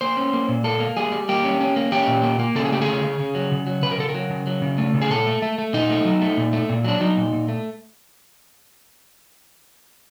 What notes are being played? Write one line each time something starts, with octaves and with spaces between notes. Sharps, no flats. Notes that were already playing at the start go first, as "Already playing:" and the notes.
A#3 C5
C#4
A#3
A#2
A#3 A4
A#3
G3 G#4
G3
A#3 G4
C#4
C#4
A#3
C#4 G4
A#2
A#3
A#3
C#3 A4
G#4
A3 G4
G#4
C#3
C#3
C#3
F#3
C#3
F#3
C#3 B4
A#4
C#3 A4
A#4
F#3
C#3
F#3
C#3
A3
C#3
G#4
A#2 A4
A3
A3
A3
A#2 D#4
A3
F#3
A3
A#2
A3
A#2
F#3 D4
F#3 D#4
A#2
A#2
A3